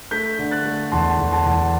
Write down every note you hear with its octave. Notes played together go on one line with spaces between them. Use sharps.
A3 G6 B6
D3
F#6 A6
A3
E2 A5 C6
E2
A5 C6
E2